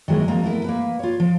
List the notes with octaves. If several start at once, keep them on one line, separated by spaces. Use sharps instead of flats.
D#3 F#3 G#3 A#3 E4
F3 A#3 C4 A#5
A3 B3 E4 A#4
A#3 B4
F4 C#5
F3